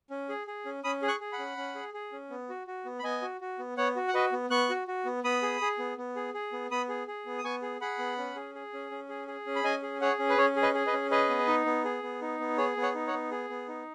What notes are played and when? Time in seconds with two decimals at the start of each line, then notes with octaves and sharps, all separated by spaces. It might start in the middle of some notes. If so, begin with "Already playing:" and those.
0.10 C#4
0.29 G#4
0.47 G#4
0.65 C#4
0.84 C#4 B5 D#6
1.02 G#4
1.08 C#6 F#6
1.20 G#4
1.32 F#5 B5
1.39 C#4
1.57 C#4
1.75 G#4
1.94 G#4
2.12 C#4
2.30 B3
2.50 F#4
2.67 F#4
2.85 B3
2.99 B5
3.03 B3 D#5 G#5
3.22 F#4
3.41 F#4
3.59 B3
3.77 B3 C#5 F#5
3.96 F#4
4.08 F#5
4.14 F#4 B4 D#5
4.32 B3
4.50 B3 C#6 F#6
4.70 F#4
4.88 F#4
5.05 B3
5.24 B3 B5 D#6
5.43 G#4
5.61 G#4
5.79 B3
5.97 B3
6.16 G#4
6.34 G#4
6.53 B3
6.71 B3 B5 D#6
6.89 G#4
7.08 G#4
7.26 B3
7.38 D#6
7.44 B3 G#5 C#6
7.62 G#4
7.81 G#4 F#5 B5
7.99 B3
8.18 C#4
8.36 G#4
8.55 G#4
8.73 C#4
8.91 C#4
9.09 G#4
9.28 G#4
9.46 C#4
9.56 B5
9.64 C#4 D#5 G#5
9.82 G#4
10.01 G#4 C#5 F#5
10.19 C#4
10.29 B4
10.38 C#4 C#5
10.56 G#4
10.62 B4 D#5
10.74 G#4
10.87 B4 D#5
10.93 C#4
11.11 G#4 B4 D#5
11.30 B3
11.47 D#4
11.66 B3
11.85 G#4
12.03 B3
12.21 D#4
12.40 B3
12.58 G#4 C#5
12.77 B3
12.82 C#5 F#5
12.94 D#4
13.07 C#5 F#5
13.13 B3
13.31 G#4
13.50 B3
13.68 D#4